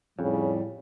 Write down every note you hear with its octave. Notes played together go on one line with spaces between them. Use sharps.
F2 A2 C#3 G3